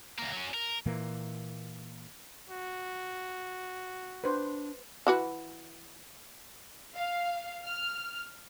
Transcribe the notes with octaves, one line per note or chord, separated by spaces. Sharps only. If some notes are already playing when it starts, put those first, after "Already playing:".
D2 A#3
F#3 C#4
A#4
A#2 E3 A#3
F#4
D4 B4 C5
E3 F#4 B4
F5
F6